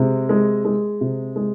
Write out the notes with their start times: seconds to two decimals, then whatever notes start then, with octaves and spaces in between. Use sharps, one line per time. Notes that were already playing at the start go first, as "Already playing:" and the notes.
Already playing: C3 G#3
0.29 G#3
0.65 G#3
1.01 C3
1.36 G#3